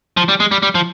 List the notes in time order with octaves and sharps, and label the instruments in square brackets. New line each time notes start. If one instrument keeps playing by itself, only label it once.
[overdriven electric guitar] F3
G3
G#3
G3
G3
F3